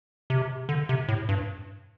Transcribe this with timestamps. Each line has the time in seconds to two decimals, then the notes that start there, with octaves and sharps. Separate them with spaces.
0.30 C3
0.69 D3
0.89 C3
1.09 A2
1.29 G2